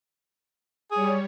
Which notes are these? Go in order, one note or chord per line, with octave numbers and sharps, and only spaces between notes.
G3 G#4 C#5